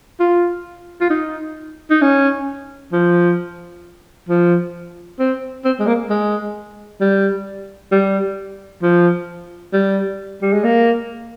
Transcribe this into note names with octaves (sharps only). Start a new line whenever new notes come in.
F4
F4
D#4
D#4
C#4
F3
F3
C4
C4
G#3
A#3
G#3
G3
G3
F3
G3
G3
G#3
A#3